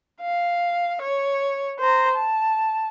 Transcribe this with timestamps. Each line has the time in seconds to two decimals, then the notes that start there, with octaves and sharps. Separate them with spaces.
0.22 F5
1.02 C#5
1.80 C5 A#5
2.15 A5